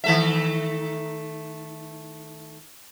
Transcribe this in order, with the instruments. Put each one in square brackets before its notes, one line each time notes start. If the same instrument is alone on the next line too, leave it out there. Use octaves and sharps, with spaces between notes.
[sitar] D#3 A3 E5